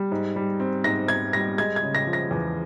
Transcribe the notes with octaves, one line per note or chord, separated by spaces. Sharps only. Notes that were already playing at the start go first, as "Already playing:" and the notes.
Already playing: G3
G#2
G3
C4
G#2 A#6
G#2 G#6
G3 A#6
G#3 G#6
G#6
C#3
A#6
F3
A#6
E2